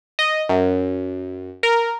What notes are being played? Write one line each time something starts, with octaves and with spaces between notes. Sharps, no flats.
D#5
F#2
A#4